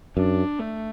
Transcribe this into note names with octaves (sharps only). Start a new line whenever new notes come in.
F#2 D4
A3